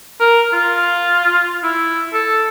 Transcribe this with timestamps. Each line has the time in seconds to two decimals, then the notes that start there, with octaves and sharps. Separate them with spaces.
0.20 A#4
0.53 F4
1.63 E4
2.14 A4